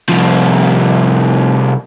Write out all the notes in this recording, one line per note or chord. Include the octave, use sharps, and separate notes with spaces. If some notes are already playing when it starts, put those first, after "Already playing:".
C2 F3